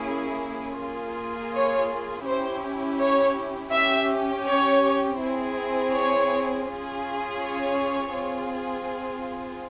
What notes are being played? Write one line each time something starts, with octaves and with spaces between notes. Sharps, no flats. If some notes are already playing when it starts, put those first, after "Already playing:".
Already playing: A#3 C#4 E4 G#4
A#3 F4 G#4
C#5
C#4 E4 G4 C5
C#5
C#4 G4 E5
C#5
C4 E4 G#4
C#5
C#4 F4 G#4
C#5
C4 F4 G#4